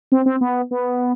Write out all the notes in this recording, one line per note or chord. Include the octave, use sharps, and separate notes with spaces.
C4
C4
B3
B3